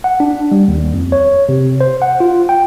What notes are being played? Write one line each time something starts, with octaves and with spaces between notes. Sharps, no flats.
F#5
D4
G3
D#2
F2
C#5
C3
C5
F#5
F4
G5